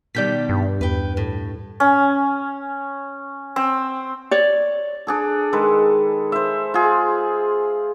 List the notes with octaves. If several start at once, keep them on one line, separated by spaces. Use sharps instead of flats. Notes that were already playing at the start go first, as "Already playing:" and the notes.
B2 D#3 G3 D5 G6 B6
G2
E2 B4 G5
A2
C#4
C4
C#5 D5
D4 G#4 A4
D#3 G#3 A4 B4
C5 E5
F4 G#4